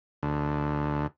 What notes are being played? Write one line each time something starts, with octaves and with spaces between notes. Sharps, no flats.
D2